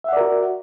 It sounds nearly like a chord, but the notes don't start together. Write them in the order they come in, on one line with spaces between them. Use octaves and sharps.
E5 F#5 D5 A#4 F#4